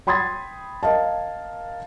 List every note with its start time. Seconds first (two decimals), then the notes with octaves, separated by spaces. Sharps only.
0.07 G5 B5 C6 D#6 G#6 A6
0.83 A#4 D#5 F5 A5